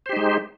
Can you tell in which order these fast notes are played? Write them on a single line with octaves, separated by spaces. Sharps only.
C5 G4 D#4 G#3